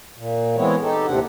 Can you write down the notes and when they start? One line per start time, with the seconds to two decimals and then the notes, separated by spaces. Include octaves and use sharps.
0.17 A#2
0.56 E3 G#3 B3 C4 E4 C#5
0.82 D#4 G4 A4
1.07 D#2 A2 C3 C4 D4 F#5